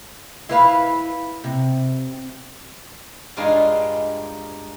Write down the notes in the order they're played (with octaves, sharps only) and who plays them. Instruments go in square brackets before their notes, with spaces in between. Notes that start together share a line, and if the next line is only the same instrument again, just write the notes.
[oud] E4 B4 F5
C3
[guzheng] G2 G3 G#3 D#4 F4 G#5